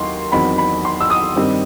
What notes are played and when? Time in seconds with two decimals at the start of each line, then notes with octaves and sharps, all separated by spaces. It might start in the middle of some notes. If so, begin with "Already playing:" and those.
Already playing: D#2 D#3 F#3 C6
0.32 E2 D#3 F#3 C4 B5
0.58 B5
0.85 C6
1.00 E6
1.10 D#6
1.36 G2 D#3 G3 C4